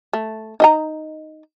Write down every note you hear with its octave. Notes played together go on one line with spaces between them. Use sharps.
A3
D#4 D#5 A#5